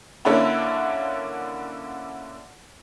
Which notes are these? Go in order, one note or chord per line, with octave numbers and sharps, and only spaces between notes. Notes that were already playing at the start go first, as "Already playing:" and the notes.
D3 A#3 C#4 D4 E4